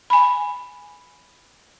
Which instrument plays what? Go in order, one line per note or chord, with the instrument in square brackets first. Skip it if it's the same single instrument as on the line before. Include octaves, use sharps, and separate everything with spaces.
[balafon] G#5 B5